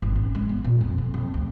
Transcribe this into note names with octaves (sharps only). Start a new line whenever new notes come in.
G#1
C#4
G#3
B3
A#2
F2
D3
F2
D2